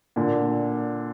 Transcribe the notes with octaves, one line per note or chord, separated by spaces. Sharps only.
A#2 D3